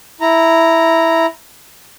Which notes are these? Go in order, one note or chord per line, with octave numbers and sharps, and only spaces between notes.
E4 A#5